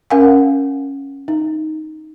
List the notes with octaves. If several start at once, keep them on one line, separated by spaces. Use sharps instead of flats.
C#4 A#4 F5 F#5 G#5
D#4